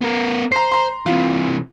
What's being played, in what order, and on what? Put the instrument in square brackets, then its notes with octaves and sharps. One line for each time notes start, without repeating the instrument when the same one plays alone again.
[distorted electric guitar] B3 A#4
[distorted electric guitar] C5 [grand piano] A#5 C7
[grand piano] A#5 C6
[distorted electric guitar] C3 E3 [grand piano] F4